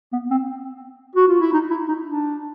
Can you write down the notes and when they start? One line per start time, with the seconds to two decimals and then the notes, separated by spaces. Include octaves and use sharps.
0.12 B3
0.31 C4
1.15 F#4
1.28 F4
1.40 E4
1.53 D#4
1.70 E4
1.88 D#4
2.06 D4